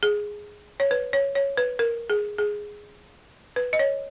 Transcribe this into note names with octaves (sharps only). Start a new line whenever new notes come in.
G#4
C#5
B4
C#5
C#5
B4
A#4
G#4
G#4
B4
D#5
C#5